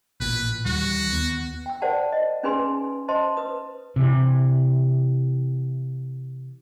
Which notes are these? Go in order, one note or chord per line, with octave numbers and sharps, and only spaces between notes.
A1 A#2 B4
D#2 E3 G3 F#4
D#2 B3
G5 E6
A#4 C5 D5 F#5 A5
D#5
C#4 D#4 G#4 B4 G#5 C6
C5 D#5 A5 C6
B4 D#6
C3 E3